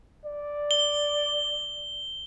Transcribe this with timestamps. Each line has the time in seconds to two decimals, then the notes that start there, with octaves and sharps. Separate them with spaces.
0.25 D5
0.71 G7